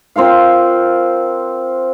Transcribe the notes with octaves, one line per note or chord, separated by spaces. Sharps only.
C4 F4 A#4 F5